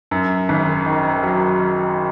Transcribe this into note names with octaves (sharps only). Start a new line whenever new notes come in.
F#2
G#1
D#3
F#3